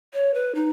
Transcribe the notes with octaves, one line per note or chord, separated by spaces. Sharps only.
C#5
B4
D#4